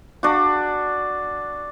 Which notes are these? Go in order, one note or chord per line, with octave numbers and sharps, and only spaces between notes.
D4 F#4